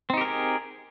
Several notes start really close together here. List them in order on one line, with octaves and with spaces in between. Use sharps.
C4 D#4 G4 A#4 G#4